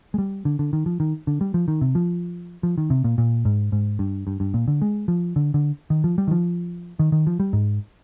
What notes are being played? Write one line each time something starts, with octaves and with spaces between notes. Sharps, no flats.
G#3
G3
D3
D3
D#3
F3
D#3
D3
G3
F3
D#3
C3
F3
F3
D#3
C3
A#2
A#2
G#2
G#2
G2
G2
G2
A#2
D3
G#3
F3
D3
D3
D#3
F3
G3
D#3
F3
D#3
D#3
F3
G3
G#2